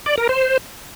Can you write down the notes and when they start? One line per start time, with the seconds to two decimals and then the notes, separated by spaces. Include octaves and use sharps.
0.06 D5
0.18 A#4
0.29 C5